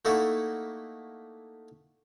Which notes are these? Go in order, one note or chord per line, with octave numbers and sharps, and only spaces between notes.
A3 A#3 D#4 E4 F#4 A4